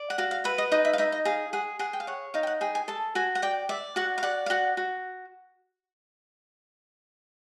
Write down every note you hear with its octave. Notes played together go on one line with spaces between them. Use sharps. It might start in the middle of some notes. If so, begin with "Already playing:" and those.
Already playing: D5
F#5
F#4 F5
F5
B4 E5
D#5
D#4 D#5
E5
F5
D#4 E5
D#5
G#4 F5
G#4 F#5
G#4 F#5
G5
F5
C#5 F#5
D#4 F5
G5
F#5
G#4 G5
G#5
A4 A5
F#4 G#5
F#5
D5 G5
D5 E5
F#4 F#5
F5
D5 F#5
F5
F#4 F#5
F#4